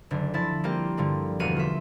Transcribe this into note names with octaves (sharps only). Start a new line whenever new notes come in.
F#1 D3 D4
F3 E4 A5 E6 A6
G3 A#3 C4 F4 G4
G2 D3 F3 G3
E1 E2 F#4 F5 D#7
F4 E5